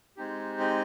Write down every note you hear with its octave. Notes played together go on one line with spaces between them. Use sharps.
G#3 C4 D#4 G4
D#5